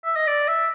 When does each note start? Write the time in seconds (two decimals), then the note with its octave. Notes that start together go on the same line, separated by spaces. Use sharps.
0.04 E5
0.16 D#5
0.27 D5
0.48 E5